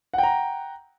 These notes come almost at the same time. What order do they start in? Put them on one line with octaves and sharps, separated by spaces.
F#5 G5 A#5